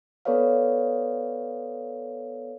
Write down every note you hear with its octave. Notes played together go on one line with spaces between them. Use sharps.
B3 A4 B4 C#5 D5 F5